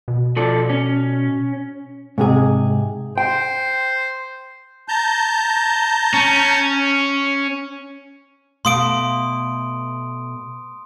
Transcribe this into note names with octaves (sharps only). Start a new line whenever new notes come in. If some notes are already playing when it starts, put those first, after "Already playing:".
B2
F3 A4 D5
C#4
G#2 C3 G#4
C5 G5
A5 A#5 G6
C#4
B2 A3 F5 C6 D#6 D7